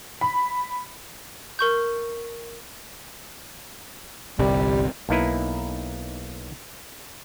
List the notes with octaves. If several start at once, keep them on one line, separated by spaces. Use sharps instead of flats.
B5
A#4 C#6 G6
G1 C2 C3 G3
B1 A#3 D#4 E4 B4